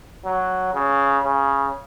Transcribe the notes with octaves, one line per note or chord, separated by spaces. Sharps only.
F#3
C#3
C#3